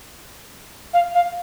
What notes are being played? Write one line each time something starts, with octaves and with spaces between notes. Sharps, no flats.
F5
F5